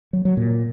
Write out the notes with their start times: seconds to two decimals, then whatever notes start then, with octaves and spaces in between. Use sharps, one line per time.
0.13 F#3
0.25 F#3
0.37 A#2